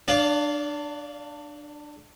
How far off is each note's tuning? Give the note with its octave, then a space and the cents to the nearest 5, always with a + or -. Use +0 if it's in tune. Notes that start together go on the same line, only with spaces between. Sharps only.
D4 +20 D5 -30 F5 +0